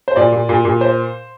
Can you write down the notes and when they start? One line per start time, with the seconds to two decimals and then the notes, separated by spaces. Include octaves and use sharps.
0.08 C5
0.16 A#2 D5
0.32 A#2
0.49 A#2
0.65 A#2
0.81 C5